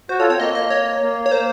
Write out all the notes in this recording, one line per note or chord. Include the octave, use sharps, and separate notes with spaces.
F#4 C5
F4 A4 C#5
C4 C#5
A#3 D#5
D#5
C#5
A#3
C#5
A#3 C5